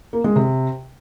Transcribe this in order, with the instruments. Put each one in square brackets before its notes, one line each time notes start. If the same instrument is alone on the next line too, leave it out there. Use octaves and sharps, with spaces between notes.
[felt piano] A#3
G#3
C3